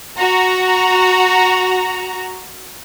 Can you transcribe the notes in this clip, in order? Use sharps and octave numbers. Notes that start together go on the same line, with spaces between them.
F#4 A#5